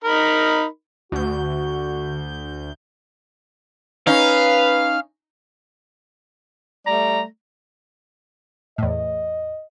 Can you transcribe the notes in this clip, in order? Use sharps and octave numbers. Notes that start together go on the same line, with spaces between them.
D#4 A#4 B5
D2 F#4 G6
C#4 D#4 B4 F5
G3 A3 D5 A#5
E2 A2 D#5